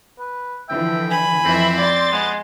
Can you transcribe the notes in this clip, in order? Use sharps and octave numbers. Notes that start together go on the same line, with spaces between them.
B4
D3 E3 F3 E5 G5
G#5 B5
F2 E3 C4 E5
D5 C6 A6
G#3 B3